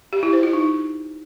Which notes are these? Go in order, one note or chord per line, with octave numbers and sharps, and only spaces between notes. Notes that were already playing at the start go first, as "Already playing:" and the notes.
G4
E4
C5
F4
D#4